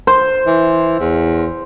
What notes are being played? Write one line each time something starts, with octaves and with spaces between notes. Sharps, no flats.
C5
E3
E2